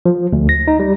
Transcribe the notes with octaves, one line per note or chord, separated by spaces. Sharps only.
F3
D2
A#6
D#4
G3